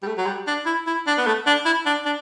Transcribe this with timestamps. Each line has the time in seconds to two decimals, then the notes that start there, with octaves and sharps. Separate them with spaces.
0.02 G3
0.07 A3
0.17 F#3
0.26 G3
0.47 D4
0.66 E4
0.87 E4
1.07 D4
1.18 B3
1.26 A3
1.47 D4
1.65 E4
1.86 D4
2.05 D4